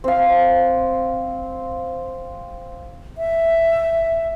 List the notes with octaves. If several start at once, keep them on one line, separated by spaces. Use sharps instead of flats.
C4 F5
E5